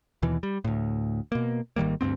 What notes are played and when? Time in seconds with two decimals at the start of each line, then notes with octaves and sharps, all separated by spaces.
0.22 D#2 B2 E3
0.43 G3
0.64 D2 A2
1.32 B2 A#3
1.76 G#1 D#3 G3 A#3
2.01 D2 G2 B3 C4